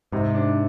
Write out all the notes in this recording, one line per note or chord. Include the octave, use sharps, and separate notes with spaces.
G#2 C3
D4